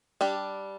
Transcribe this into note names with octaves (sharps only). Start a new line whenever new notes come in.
G3 D4 G4